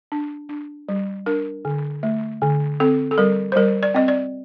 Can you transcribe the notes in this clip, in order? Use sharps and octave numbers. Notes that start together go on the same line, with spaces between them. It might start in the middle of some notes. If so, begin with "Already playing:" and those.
D4
D4
G3
D4 A#4
D3
A3
D3
C4 A4
A4
G3 A#4
C5
G3 A#4
D5
C4 D#5
D5